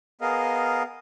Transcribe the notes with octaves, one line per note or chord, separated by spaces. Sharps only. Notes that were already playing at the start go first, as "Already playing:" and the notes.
B3 G#4 A#4 D#5 F5